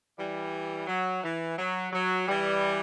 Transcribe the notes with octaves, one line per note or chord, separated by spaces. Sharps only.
E3 G3
F#3
E3
F#3
F#3
E3 G3